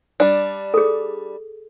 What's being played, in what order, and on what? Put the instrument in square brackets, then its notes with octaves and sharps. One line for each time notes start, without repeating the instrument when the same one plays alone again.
[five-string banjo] G3 D4
[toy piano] G#4 A4